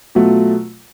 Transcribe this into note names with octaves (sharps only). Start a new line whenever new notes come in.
B2 F#3 A3 F4